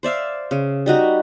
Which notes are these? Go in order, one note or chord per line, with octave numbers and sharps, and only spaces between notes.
C5 D5 E5 F5
C#3
G3 D#4 F#4 B4